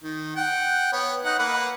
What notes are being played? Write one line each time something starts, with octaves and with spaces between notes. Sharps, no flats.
D#3
F#5 G5
B3 C#5
D#4 F#5
A#3 B4 F#5